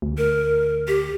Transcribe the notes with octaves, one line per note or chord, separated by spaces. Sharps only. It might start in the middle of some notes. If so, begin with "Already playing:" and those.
D2
A#4
G4